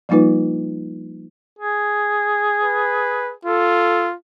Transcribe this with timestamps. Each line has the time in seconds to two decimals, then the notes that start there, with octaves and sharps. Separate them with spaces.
0.09 F3 G3 A#3 D#4 F4 B4
1.59 G#4
2.63 B4
3.45 F4 A4